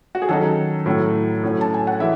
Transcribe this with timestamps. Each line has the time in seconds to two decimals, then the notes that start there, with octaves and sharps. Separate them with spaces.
0.15 F#4
0.22 G#4
0.29 D#3 F#3 C#4 A4
0.86 A2 F#3 C#4
1.43 A2 F#3 C#4
1.61 A5
1.74 G#5
1.87 F#5
2.00 E3 G#3 C#4 E5